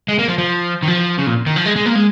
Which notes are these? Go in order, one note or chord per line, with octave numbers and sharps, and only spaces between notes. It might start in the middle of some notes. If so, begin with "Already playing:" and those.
G#3
A#3
F3
F3
D#3
F3
C#3
A#2
D#3
F3
G#3
G#3
A#3
G#3